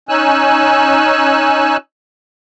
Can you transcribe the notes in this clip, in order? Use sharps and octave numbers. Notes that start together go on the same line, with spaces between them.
C#4 D#4 G#5 E6 F#6